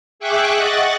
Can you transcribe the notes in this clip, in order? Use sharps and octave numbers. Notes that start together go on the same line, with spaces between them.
G#4 E5 G5 C#6 D6 F#6
D#5 F#5 C#6 F#6 A6